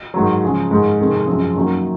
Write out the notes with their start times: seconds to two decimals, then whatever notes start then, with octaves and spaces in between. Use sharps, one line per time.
0.14 G#2 D#3 F#3
0.42 C#3 F3 G#3
0.71 G#2 D#3 G#3
0.99 F2 C3 D#3 G#3
1.27 F#2 F3 G#3 C4
1.55 F#2 D#3 F#3 A#3